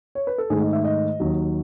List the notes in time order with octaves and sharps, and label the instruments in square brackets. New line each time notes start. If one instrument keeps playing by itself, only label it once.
[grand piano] C#5
B4
A4
G#2 D#3 A3 G#4
D#5
E5
D#5
D#2 D#3 F#3